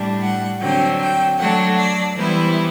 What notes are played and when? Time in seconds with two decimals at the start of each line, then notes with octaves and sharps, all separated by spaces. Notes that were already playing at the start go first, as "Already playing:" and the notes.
Already playing: A2 G3 D4
0.23 F#5
0.61 D3 F#3 C4 G5
1.01 G5
1.39 F#3 A3 D4 F#5
1.78 D5
2.17 E3 G3 B3 E4 C5